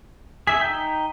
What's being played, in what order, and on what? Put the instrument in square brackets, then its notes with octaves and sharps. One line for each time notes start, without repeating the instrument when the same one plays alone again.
[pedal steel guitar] G#4 E5 [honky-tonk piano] B6
[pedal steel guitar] D#4 G5